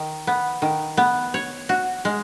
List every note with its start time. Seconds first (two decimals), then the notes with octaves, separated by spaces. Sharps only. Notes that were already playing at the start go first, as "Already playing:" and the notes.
Already playing: D#3
0.27 B3
0.62 D#3
0.97 B3
1.34 C#5
1.69 F#4
2.05 G#3